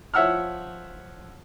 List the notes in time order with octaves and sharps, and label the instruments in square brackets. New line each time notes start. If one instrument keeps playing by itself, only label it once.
[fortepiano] F3 C#5 E5 F#5 E6 F6